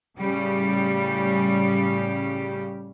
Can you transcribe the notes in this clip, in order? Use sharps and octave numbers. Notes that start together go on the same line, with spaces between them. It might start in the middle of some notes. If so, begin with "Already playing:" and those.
A2 C#3 G3 C#4 G4